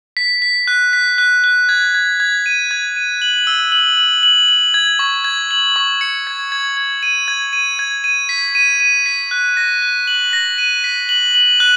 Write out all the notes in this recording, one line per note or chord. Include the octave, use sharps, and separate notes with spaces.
B6
B6
F#6
B6
F#6
F#6
G#6
G#6
G#6
D#7
G#6
D#7
F#7
E6
F#7
F#7
F#7
F#7
G#6
C#6
G#6
F#7
C#6
C#7
G#6
G#6
G#6
D#7
G#6
D#7
G#6
D#7
B6
D#7
D#7
B6
F#6
A#6
F#6
F#7
A#6
D#7
B6
F#7
F#7
F#6